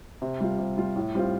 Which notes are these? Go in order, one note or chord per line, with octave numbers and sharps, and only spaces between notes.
C3
G3 F4
C3
G3 F4
A2
G3 C4 F4